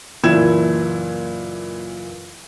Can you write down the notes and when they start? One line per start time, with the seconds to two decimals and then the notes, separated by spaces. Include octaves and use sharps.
0.23 F#1 A#2 E3 E4 G#6 E7